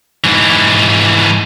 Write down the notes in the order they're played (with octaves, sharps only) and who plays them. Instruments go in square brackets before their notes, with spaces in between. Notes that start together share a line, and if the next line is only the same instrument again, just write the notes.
[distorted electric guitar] G#2 E3